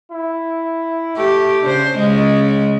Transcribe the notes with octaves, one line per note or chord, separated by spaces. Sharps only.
E4
A3 G4
C#3 D4 C5
C#3 G#3 D#5